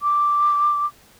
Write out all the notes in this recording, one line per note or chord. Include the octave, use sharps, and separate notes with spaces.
D6